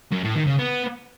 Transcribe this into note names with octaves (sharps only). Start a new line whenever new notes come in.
F#2
A2
D#3
C#3
B3